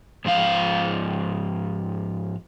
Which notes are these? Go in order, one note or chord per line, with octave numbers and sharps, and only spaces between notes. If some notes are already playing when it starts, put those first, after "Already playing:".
G#2 F3 F4 F5